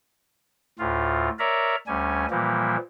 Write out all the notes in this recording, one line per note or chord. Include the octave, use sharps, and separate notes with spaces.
D2 A2 F4
A#4 C#5 D5 E5 A#5
D2 G3 C#4 G#5
A#2 E3 F3 G3 A#3